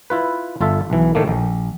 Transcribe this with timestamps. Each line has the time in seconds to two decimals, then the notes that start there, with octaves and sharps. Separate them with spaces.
0.10 E4 F4 B4
0.61 G1 F4 A4 E5
0.90 B1 E3
1.15 A2 D#3 A3 A#3
1.28 A#1